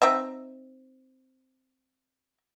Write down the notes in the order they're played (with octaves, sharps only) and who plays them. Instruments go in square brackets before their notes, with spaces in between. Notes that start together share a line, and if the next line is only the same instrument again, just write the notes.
[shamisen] C4 D#4 E5